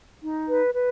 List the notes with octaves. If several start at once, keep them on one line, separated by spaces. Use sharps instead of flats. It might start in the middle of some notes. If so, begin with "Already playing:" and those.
D#4
B4
B4